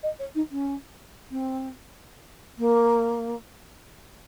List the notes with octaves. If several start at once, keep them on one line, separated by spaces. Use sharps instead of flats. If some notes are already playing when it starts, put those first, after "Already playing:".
D#5
C#5
D#4
C#4
C4
A#3